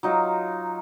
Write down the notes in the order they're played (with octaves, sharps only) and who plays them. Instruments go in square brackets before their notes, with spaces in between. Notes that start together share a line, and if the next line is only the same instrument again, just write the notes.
[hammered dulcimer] F#3 D#4 F4